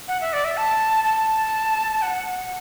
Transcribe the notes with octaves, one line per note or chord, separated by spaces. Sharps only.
F#5
E5
D5
E5
A5
A5
F#5